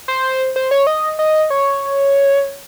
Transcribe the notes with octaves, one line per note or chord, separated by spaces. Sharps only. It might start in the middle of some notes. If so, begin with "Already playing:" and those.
C5
C5
C#5
D#5
D#5
C#5